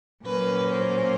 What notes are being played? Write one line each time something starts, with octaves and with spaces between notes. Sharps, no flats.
A#2 F#3 A#3 C#4 B4
C5